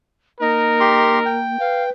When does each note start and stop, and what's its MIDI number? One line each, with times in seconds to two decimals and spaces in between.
0.40 1.59 58
0.40 1.23 63
0.40 1.47 70
0.80 1.19 67
0.80 1.19 84
1.25 1.90 79
1.60 1.90 71
1.60 1.84 77